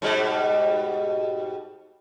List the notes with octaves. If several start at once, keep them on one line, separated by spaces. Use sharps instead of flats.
G#2 B2 G3